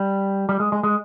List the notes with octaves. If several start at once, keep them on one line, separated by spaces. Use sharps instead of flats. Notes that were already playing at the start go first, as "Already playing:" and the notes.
Already playing: G3
G3
G#3
G#3
G#3